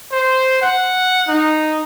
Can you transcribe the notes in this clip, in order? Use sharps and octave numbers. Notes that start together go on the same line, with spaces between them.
C5
F#5
D#4